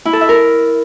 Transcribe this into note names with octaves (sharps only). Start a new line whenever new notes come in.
E4
A4
E5
A#4